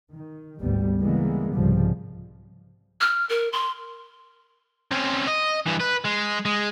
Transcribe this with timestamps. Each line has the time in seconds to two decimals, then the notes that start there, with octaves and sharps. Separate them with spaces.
0.12 D#3
0.59 G#1 D2 G3 B3
1.00 C#3 E3 G3 G#3 A#3 B3
1.53 C2 G#2 C#3 F3 G3
3.01 F6
3.29 A#4
3.52 C6
4.91 C4 C#4
5.27 D#5
5.66 G2 E3
5.80 B4
6.04 G#3
6.45 G#3